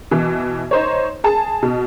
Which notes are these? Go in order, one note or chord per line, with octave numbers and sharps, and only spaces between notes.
B2 E3
D#4 C5 C#5
G#4 A5
B2